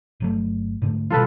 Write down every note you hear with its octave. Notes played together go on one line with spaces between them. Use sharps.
G1 F#3 A3
G#2 D3 A3
B2 D#3 G3 F4 A4 B4